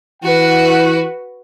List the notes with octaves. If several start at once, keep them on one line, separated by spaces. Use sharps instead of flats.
E3 F#4 B4 F#5